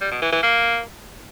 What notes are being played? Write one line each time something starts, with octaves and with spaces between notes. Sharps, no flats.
G3
B2
E3
E3
A#3